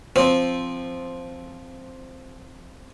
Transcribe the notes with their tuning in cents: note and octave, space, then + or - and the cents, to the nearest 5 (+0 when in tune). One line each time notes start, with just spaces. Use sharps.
F3 +0 C4 +0